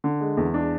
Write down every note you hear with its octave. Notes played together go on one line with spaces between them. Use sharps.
D3
G#3
E2
D4